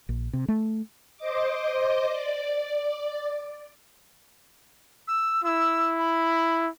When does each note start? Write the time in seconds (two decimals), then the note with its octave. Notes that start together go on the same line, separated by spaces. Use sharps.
0.09 A#1
0.33 C3
0.48 A3
1.17 C5 D#5 D6
2.09 D5
5.08 E6
5.44 E4 E6
5.99 B5